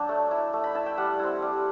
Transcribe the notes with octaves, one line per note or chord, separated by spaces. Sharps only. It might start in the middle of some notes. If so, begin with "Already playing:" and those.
Already playing: F#3 D4 G5 A5
A3
E4
A3
B5
E4 A5
G5
G3 F#5
C4 E4
G3